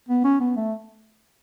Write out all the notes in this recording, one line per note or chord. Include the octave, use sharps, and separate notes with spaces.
B3
C#4
B3
A3